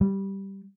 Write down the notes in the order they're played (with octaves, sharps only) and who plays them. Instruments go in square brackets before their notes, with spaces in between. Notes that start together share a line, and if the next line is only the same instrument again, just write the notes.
[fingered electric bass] G3